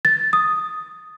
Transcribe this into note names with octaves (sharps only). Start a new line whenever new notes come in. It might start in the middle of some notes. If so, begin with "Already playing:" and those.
A6
D#6